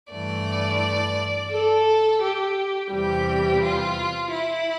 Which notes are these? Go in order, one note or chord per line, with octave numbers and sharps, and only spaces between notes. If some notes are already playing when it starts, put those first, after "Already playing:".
G2 E3 A3 D5
A4
G4
E2 C3 E3 G3 G4
F4
E4